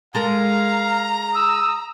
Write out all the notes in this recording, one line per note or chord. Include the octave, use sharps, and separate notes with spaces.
G#3 A4 A#4 F5 A#5
D#6 E6